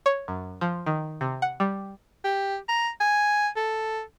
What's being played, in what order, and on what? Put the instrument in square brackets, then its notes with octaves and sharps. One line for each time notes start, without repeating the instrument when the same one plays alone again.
[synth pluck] C#5
F#2
F3
D#3
C3
F#5
G3
[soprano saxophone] G4
A#5
G#5
A4